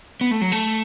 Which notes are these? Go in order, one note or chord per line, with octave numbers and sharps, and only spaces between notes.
B3
A3
F#3
A3